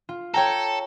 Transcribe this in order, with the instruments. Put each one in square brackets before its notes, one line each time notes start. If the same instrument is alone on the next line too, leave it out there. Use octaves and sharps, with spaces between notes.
[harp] F4
[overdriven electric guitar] A4 [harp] C#5 G5 A#5